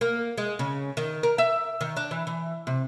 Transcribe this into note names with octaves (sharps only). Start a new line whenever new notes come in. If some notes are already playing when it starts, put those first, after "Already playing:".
A#3
G#3
C#3
D#3
A#4
E5
D#3
D4
E3
E3
C3